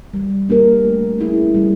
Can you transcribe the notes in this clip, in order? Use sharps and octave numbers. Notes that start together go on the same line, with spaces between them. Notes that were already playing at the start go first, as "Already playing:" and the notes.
G3
A#3 D4 G4 A#4
A3
C#4 E4 G#4
G3